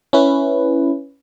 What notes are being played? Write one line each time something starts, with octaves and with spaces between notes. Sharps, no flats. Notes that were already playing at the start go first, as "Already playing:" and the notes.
C#4 E4 B4